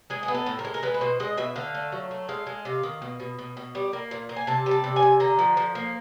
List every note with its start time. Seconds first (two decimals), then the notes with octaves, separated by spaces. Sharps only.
0.10 G#3 G#4
0.23 G#4
0.28 B3
0.34 A4
0.46 A2
0.59 A#4
0.65 G#3
0.74 A#4
0.83 G#3 B4
0.94 B4
1.01 B2 C5
1.20 G#3 D#5
1.37 B2 E5
1.56 D3 F5
1.74 A3
1.92 F#3
2.11 A3
2.29 G#3 F5
2.47 G#3
2.65 C3 F5
2.83 D#3
3.02 B2
3.20 B2
3.39 B2
3.57 B2
3.75 G3
3.93 A#3
4.11 A#2
4.29 A#3
4.36 G#5
4.47 C3 A5
4.66 G3
4.71 A5
4.84 C3
4.96 G#5
5.02 C3
5.20 D3 A#5
5.39 F3
5.57 F3
5.75 A#3